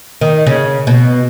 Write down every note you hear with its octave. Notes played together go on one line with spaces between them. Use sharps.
D#3
C#3
B2